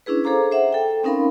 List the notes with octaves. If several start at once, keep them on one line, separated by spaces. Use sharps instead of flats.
C#4 D4 E4 G#4 B4
G#4 A4 C5 F5 A#5 D6
C5 E5 F#5
A4 G5
C4 C#4 D#4 A#4 F5 B5